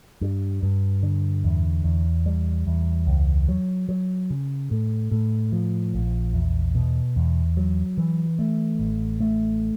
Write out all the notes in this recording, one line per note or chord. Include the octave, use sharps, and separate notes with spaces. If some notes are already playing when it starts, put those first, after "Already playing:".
G2
G2
D3
E2
E2
G3
E2
C#2
F#3
F#3
C#3
A2
A2
F3
A#1
E2
B2
E2
F#3
E3
A3
A1
A3